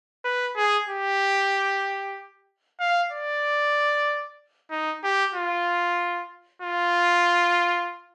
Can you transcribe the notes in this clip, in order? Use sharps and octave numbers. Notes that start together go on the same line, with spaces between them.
B4
G#4
G4
F5
D5
D#4
G4
F4
F4